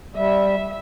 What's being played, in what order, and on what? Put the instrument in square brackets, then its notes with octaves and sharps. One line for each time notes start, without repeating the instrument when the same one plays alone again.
[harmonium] G3 [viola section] E5